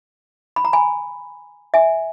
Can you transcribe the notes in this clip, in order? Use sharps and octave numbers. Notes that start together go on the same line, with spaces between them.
B5
A#5
G#5 B5
E5 G#5